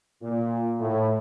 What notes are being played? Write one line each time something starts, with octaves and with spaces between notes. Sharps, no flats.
A#2
A2